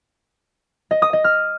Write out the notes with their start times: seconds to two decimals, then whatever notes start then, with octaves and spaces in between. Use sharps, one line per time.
0.91 D#5
1.02 D#6
1.13 D#5
1.24 F6